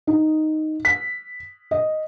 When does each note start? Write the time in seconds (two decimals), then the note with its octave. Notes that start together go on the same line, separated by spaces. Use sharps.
0.07 D#4
0.85 B6
1.71 D#5